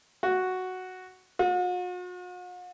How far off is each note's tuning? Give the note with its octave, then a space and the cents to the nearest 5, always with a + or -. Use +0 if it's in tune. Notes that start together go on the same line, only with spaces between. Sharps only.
F#4 +0
F#4 -45